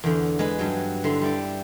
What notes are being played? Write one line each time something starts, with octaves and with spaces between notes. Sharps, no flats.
E2 D3
G#3 B4
G2 F#3
D3 E4 C6
G3 E4 D5